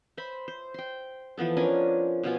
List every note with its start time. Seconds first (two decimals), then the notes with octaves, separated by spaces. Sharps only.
0.17 C5 E5 B5 C6
0.48 C5
0.74 G5 C6
1.37 E3 F3 B3 A4
1.57 C#4 D4 A#4 G#5
2.23 B2 F3 F4 G#5